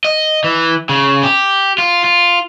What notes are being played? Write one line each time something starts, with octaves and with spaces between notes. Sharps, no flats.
D#5
E3
C#3
G4
F4
F4